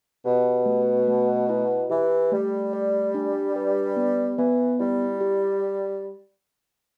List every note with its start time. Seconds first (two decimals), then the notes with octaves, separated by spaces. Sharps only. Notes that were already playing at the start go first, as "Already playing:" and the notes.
0.25 B2 G4
0.66 A3
1.08 A3
1.49 E4
1.89 E3 G4
2.32 G3 A3
2.73 D5
3.15 D4
3.56 B4
3.96 B3
4.37 E3 B3
4.79 G3 E4
5.21 G4